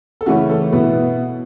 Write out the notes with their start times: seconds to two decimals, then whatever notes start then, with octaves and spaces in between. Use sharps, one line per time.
0.21 A4
0.26 C#3 E3 A3 C#4 E4 F#4
0.49 A4
0.73 B2 B3 E4